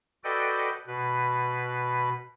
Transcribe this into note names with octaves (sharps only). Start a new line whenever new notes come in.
F#4 A4 B4 D5 D#5 G5
B2 B4